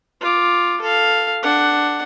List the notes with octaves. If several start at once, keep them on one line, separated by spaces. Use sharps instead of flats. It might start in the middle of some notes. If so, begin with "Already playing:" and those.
F4 D6
A4 F5
D4 F#5